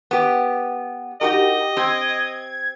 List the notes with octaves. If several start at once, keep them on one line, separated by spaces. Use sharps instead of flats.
B3 G4
D#4 F#4 G4 A#4 D#5
C4 G4 G#6